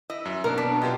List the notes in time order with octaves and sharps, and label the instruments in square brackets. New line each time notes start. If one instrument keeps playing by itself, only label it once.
[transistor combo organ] E4 [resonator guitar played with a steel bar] D#5
[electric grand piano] F#2 E5
[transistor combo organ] B2 [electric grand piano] A#3 D4 [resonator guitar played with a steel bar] A#4
[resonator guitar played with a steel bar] D4 [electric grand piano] B6
[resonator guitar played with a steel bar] F#2 [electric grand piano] F4 G4 D#5